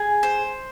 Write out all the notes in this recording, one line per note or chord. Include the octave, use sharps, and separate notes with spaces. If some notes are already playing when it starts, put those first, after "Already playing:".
Already playing: G#4
C5